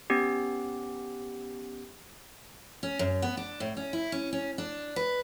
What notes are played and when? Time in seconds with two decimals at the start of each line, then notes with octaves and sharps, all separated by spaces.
0.10 B3 C#4 G4
2.83 C#4
2.99 F#2
3.22 B3
3.37 D4
3.60 A2
3.77 C#4
3.93 E4
4.12 C#4
4.33 C#4
4.58 D4
4.96 B4